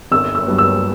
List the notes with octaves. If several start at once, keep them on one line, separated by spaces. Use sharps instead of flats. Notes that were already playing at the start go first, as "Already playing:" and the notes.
G1 E6
E6
G2 F#3 B3
E6